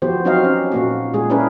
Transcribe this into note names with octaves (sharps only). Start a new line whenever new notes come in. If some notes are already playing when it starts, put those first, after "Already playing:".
E3 F3 B3 F#4 G4 C5
F#3 C4 D#4 F#4 D#5 F5
C#4
A#2 A#3 F#4
A#2 G#3 G#4
C#4 D4 E4 G#4 A#4 B4